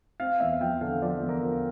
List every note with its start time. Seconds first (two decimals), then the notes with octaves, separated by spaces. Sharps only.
0.20 C4 F5
0.40 E2 E5
0.61 F3 G5
0.81 D3 F5
1.02 F3 D5
1.22 E2
1.29 A#4
1.43 F3